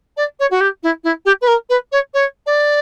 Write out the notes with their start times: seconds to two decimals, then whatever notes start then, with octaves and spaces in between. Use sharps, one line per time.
0.17 D5
0.39 C#5
0.50 F#4
0.60 G4
0.83 E4
1.04 E4
1.25 G4
1.41 B4
1.47 A#4
1.69 B4
1.92 C#5
2.13 C#5
2.46 D5